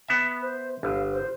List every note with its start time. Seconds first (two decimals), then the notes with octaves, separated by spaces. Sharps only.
0.08 B3 E5
0.42 C5
0.83 G1 F5
1.12 C5